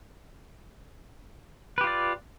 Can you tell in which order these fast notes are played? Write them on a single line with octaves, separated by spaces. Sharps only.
B4 G4 F4 D5